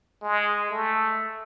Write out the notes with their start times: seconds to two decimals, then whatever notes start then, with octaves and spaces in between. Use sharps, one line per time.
0.23 G#3
0.71 A3